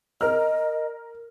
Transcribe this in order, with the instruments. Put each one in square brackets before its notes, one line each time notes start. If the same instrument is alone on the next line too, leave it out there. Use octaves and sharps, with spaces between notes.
[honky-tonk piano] A#4 F6 [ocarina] D#5